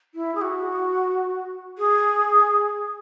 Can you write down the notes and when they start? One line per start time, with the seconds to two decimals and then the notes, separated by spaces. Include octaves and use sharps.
0.15 E4
0.35 G#4
0.42 F#4
1.78 G#4